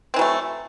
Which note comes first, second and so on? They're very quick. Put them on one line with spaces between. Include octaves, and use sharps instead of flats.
C4 E3 F#3 A3